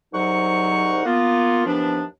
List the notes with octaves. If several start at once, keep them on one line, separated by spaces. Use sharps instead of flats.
C2 G#2 F#3 D#4 F#5 C#6
A#3 B3 F4
D#2 E3 F3 B3 D4